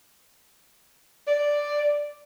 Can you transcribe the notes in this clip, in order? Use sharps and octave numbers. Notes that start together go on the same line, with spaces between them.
D5